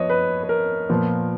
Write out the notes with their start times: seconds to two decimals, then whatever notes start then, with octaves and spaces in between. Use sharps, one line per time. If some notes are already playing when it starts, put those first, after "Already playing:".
Already playing: F3 B3 C#5 D#5
0.10 B4
0.43 B4
0.49 A#4
0.89 A#2 F3 B3